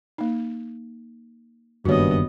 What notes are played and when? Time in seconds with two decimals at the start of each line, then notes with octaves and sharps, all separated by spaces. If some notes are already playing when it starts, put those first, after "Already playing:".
0.18 A#3 D#4
1.85 F#1 G2 D#3 A#3 B3 F#4 C#5 D#5